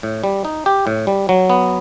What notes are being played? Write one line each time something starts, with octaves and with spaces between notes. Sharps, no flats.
A2
G3
D#4
G4
A2
G3
F#3
B3